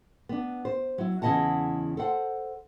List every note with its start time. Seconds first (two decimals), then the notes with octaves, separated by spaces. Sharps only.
0.29 B3 D4
0.65 C5
0.98 F#3 E4
1.22 E2 C#3 E4 D#5 F#5 A5
1.97 A4 C5 F#5